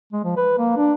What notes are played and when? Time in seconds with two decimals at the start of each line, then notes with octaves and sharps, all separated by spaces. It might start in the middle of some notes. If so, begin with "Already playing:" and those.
0.13 G#3
0.24 F3
0.37 B4
0.58 A#3
0.77 D4